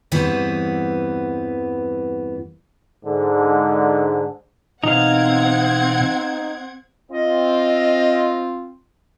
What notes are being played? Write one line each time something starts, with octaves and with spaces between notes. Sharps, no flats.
E2 G2 E3 B3 C4 C#5
G#2 D3
B2 E3 C4 D#4 F5 F#5 G#6
C4 F4 D#5